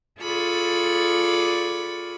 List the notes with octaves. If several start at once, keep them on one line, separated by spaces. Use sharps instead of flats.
F4 G#4 A4 D5 B5 C#6